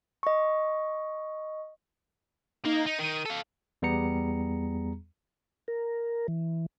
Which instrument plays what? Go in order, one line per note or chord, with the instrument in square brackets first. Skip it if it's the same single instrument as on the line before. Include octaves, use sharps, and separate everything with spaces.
[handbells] D#5 C#6
[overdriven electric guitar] A#3 [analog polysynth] D#4
[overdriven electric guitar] D#4 [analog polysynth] D#7
[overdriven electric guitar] D#3
A4 F5
[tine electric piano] E2 G3 B3 G#4 A#5 C#7
[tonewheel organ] A#4
E3